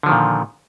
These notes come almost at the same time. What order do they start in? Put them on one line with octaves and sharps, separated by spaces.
D3 F3 D#3 A#2